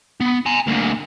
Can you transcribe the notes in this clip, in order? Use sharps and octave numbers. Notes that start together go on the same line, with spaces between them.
B3
G#5 A#5
D2 A#2